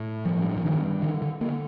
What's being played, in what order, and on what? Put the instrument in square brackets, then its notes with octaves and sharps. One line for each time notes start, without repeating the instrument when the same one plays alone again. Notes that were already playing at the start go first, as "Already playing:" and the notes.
Already playing: [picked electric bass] A2
G2 F3
F3
G2 D#3
D3 D#3
D3
D3 A#3